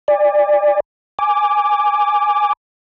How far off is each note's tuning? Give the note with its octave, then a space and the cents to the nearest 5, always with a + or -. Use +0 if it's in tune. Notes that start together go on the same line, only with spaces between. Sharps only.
D5 +5 G#5 -25
G#5 +0 D6 +0